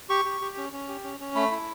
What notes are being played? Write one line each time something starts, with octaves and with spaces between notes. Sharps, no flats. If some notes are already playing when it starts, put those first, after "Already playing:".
G4 C#6
G4
G4
C#4
C#4
G4
C#4
C#4
A3 B5
E4